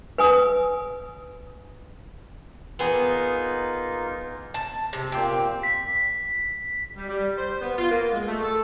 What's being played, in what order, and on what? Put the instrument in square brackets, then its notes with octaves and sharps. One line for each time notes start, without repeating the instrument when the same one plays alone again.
[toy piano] B4 G#5 D#6
[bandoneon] A#3 D#4 F4 [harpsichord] B3 G#4
[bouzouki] A5
C3
[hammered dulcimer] A#2 G4 C6 [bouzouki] C4
[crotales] B6
[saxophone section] G3
G3
C5
B3
F4
A#3
G#3
A3
A4